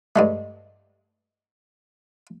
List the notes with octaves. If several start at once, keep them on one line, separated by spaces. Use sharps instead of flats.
G2 G#3 A3